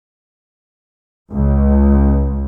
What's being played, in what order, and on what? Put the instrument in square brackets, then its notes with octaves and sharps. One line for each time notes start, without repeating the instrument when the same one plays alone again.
[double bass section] C#2